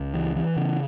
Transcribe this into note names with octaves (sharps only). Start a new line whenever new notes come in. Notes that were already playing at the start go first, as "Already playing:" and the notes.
Already playing: C#2
E3
E3
C#3